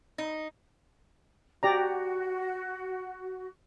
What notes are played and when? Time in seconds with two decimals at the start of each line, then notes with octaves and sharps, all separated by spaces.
0.18 D#4
1.63 F#4 G4 D5 A#5